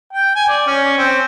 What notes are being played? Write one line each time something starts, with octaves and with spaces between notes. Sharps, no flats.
G5
G#5
D5
C#4
C4